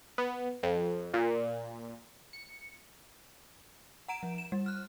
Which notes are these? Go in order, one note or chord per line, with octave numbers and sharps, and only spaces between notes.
B3
F2
A#2
C#7
F#5 A#5 D7 E7
F3
E7
G3
F6 F#6